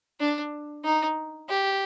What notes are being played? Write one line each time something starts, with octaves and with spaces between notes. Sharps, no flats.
D4
D#4
G4